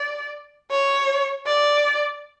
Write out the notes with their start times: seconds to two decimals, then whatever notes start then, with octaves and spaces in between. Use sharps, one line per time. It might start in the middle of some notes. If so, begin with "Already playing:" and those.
Already playing: D5
0.71 C#5
1.46 D5